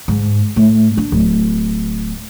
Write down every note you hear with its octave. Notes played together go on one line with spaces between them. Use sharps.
G#2
A2
D4
D1